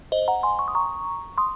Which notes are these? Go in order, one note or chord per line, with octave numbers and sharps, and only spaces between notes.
C5 D#5
F#5 A#5
G#5 C6
C#6
D#6
A#5 C#6
C6 D#6